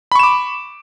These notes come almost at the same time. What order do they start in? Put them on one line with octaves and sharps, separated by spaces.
B5 C#6 E7 D6